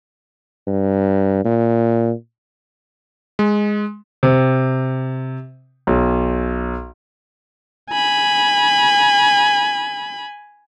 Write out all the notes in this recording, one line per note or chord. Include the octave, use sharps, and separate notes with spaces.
G2
A#2
G#3
C3
B1
G#5 B5